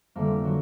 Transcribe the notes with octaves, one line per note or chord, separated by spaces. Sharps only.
F1 F2 D3 G3 A#3
F#3